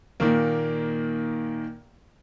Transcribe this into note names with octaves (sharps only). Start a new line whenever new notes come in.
A#2 D#3 A#3